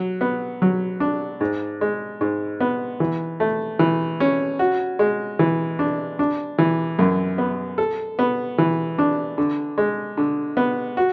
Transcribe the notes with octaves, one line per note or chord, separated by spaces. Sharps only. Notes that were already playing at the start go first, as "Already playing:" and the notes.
Already playing: F#3
B3
F#3
D4
G#2
G#3
G#2
B3
E3
A3
E3
C#4
F#4
G#3
E3
D4
D4
E3
F#2
B3
A4
B3
E3
D4
D3
G#3
D3
B3
F#4